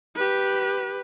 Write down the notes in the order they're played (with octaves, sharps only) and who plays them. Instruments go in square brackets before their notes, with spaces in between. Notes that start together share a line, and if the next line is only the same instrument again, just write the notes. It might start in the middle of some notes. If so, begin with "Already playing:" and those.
[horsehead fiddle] G4 B4